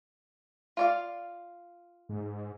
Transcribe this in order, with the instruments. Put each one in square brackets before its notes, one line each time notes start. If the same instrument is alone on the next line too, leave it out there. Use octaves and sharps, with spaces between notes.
[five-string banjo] F4 D5 F5
[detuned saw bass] G#2